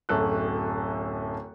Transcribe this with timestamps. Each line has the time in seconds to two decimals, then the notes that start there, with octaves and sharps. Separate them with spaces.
0.09 D1 F#2 A4 F#6